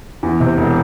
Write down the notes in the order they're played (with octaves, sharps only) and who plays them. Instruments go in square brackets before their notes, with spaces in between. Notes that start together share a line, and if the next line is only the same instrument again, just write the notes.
[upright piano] E2
C3
E1